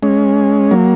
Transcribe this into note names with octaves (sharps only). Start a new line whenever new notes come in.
G#3 C#4
F#3 A#3